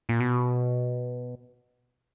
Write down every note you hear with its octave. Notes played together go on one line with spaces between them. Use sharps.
A#2
B2